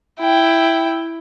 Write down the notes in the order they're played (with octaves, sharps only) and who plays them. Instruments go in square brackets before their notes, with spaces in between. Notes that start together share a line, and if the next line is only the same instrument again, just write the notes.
[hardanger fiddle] E4 G5